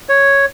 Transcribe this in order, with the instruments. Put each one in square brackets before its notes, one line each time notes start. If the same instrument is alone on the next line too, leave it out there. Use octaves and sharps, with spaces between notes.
[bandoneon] C#5